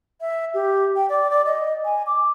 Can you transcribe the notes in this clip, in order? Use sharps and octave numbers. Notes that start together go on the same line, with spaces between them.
E5
G4
G5
D5
D5
D#5
G#5
D6